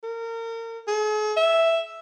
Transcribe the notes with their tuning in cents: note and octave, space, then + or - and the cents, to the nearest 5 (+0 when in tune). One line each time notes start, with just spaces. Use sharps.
A#4 -30
G#4 +45
E5 +0